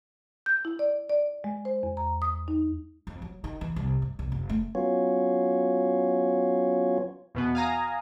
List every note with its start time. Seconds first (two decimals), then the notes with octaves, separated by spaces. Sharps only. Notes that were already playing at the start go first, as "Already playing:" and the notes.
0.46 G6
0.65 E4
0.79 D5
1.10 D5
1.44 G#3
1.65 C5
1.83 E2
1.97 A#5
2.22 D#6
2.48 D#4
3.07 F2
3.22 F#3
3.44 D#3
3.61 E3
3.76 C2
4.02 G2
4.19 C2
4.32 F#1
4.49 A3
4.75 F#3 B3 C#4 F4 C#5
7.35 E2 B2 B3
7.55 F5 G#5 A#5 D#6